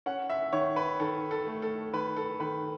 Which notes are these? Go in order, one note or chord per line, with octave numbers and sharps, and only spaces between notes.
C#4 F#5
E5
D#3 C#5
B4
D#3 A4
A4
A3
A4
D#3 B4
A4
D#3 B4